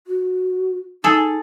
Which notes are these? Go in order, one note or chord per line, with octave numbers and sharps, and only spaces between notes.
F#4
D#4 G#4 A4